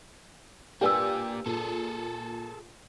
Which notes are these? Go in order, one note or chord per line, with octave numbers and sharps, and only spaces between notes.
A#3 D4 F4 G4 B4 D5 G#5 E6
A#2 G#4 A4